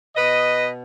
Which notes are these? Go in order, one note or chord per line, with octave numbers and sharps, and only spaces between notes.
B2 B4 D#5